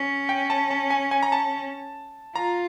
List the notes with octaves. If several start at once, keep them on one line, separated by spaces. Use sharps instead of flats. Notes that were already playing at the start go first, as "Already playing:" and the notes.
Already playing: C#4
G5
A5
A5
G#5
G#5
A#5
A5
F4 A#5